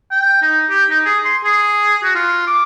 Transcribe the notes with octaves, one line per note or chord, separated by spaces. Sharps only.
G5
D#4
G4
D#4
G#4
C6
G#4
F#4
F4
D6